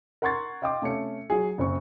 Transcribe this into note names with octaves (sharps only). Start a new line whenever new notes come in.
A#4 F#5 C6 C#6 G#6 A6
D#5 F5 G5 C6 D6
C3 A3 C#4 C#7
F#3 F#4 G#4
F#1 C4 C#6